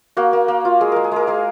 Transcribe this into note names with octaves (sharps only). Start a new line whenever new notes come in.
A#3 F#4
A#3
A#3
F4
G#3 G#4
G#3 A#4
G#4
G#3 A#4
G#3 G#4